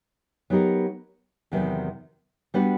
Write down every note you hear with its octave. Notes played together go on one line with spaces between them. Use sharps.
F#3 B3 D#4 G4 A#4
E2 C3 D#3 F#3 B3
G3 B3 D4 F#4 B4